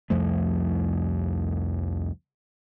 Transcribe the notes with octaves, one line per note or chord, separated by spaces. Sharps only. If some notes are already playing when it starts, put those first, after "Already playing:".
C2 F2 F3 A3